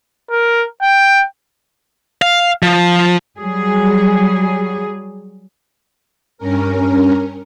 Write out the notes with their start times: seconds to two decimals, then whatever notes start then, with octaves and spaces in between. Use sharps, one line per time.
0.31 A#4
0.82 G5
2.22 F5
2.63 F3
3.37 F#3 G3 G#4
6.38 G2 C#4 A#4